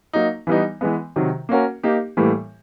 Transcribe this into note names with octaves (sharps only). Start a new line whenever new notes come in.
F#3 A#3 D#4
E3 G3 B3 D#4
E3 G#3 B3
C3 D#3 F#3
A#3 C#4 F#4 A#4
A#3 D#4 G4
A2 E3 G3 A#3